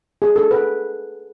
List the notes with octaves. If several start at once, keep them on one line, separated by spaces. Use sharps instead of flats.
G#4
A4
B4